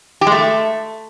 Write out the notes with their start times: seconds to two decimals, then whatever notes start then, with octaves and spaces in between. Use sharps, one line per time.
0.21 G4
0.27 G#3
0.32 A3